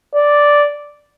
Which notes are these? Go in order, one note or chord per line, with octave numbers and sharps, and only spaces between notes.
D5